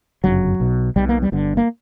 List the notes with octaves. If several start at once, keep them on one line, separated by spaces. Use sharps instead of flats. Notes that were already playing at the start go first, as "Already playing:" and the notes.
G1 F#2 C#3 F#3
B1 B2
B1 B2 G3
A#3
G3
G1 G2 D3
A#3